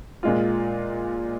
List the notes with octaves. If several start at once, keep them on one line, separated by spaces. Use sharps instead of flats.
A#2 G#3 F4